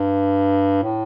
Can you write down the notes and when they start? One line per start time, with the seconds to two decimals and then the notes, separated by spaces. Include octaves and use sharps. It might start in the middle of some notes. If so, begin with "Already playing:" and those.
Already playing: G2
0.83 A2